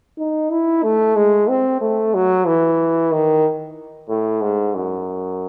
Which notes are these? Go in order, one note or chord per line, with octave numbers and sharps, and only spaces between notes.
D#4
E4
A3
G#3
C4
A3
F#3
E3
D#3
A2
G#2
F#2